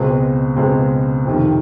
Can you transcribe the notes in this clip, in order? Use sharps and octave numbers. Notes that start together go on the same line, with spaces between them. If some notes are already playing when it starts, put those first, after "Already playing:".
Already playing: C#2 B2 G#3 C4
C#2 B2 G#3 C4
F2 C3 D#3